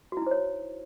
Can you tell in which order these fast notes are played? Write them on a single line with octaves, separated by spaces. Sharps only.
F#4 E4 D#4 C5 C#5